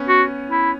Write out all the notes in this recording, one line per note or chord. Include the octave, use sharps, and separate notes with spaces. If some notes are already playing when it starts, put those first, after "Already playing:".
Already playing: B3 C#4
F#4
E4